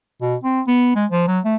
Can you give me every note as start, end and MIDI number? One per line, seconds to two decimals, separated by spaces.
0.21 0.36 47
0.44 0.61 60
0.67 0.91 59
0.95 1.06 56
1.11 1.24 53
1.27 1.39 54
1.45 1.56 57